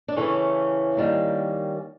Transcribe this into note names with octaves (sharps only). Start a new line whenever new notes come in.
D4
C#3 E3 A3 C#4
D#3 G3 A#3